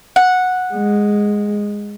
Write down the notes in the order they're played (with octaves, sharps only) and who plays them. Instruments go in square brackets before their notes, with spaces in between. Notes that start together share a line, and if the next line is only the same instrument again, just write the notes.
[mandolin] F#5
[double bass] G#3